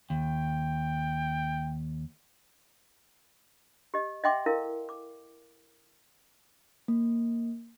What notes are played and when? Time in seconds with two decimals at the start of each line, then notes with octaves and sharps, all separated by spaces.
0.10 D#2 G5
3.94 G4 D#5
4.24 D#5 E5 F#5 G5 C6 D6
4.46 E4 A4 A#4 F5
4.89 D6
6.88 A#3